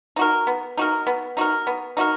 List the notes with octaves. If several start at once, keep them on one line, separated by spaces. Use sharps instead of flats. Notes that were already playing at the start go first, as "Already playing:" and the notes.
D#4 F#4 A#4
B3
D#4 F#4 A#4
B3
D#4 F#4 A#4
B3
D#4 F#4 A#4